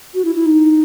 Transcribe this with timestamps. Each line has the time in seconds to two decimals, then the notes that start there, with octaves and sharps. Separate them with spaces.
0.15 F#4
0.25 E4
0.35 E4
0.46 D#4